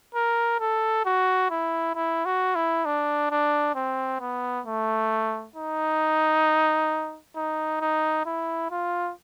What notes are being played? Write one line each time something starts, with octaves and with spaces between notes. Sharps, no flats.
A#4
A4
F#4
E4
E4
F#4
E4
D4
D4
C4
B3
A3
D#4
D#4
D#4
E4
F4